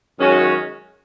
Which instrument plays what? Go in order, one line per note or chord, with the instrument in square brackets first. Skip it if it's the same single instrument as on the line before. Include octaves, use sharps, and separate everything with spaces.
[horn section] F#2 D#3 G#3 C#4 F#4